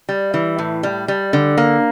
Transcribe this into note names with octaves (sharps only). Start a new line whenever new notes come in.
G3
E3
A2
G3
G3
D3
A#3